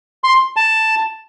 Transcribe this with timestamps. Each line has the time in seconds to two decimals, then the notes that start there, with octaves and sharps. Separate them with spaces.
0.24 C6
0.57 A5